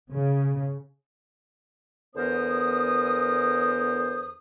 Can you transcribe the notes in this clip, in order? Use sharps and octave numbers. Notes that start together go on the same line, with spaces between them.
C#3
E2 D3 B3 A#4 C5 D#6